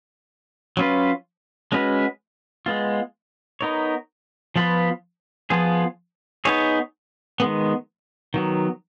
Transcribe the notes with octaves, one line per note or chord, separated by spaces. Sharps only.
F#3 C#4 F4 B4
G#3 C#4 F#4 B4
G#3 B3 F4
B3 D#4 A#4 C#5
F3 B3 F4 B4
F3 B3 F4 G#4
B3 D#4 G#4 C#5
D#3 G#3 B3
D#3 F#3 B3